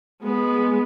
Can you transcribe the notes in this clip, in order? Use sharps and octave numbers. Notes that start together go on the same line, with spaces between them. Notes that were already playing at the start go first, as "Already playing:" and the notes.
G#3 B3